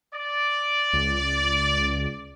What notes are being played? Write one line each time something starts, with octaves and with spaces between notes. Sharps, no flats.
D5
C#2